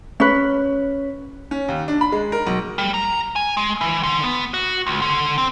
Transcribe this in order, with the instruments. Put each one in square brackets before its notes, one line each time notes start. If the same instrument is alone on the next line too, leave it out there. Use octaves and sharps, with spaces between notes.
[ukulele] C#4 B4
[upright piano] C#4
D#2
D4
B5
G#3
A#4
B1
[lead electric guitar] G3
A#5
G#5
G#3
E3
D3
B3
F#4
C#2
D3
C4